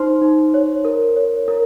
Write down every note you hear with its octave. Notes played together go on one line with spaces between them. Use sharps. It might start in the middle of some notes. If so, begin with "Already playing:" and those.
Already playing: D#4 C5 C6
D#4
C#5
A#4
C#5
A#4